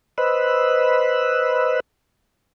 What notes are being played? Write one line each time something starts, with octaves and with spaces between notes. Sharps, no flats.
B4 C5 D#5 B5 E6 F#6